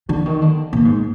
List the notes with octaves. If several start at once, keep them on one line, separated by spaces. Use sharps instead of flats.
D3
D#3
D3
A#2
G#2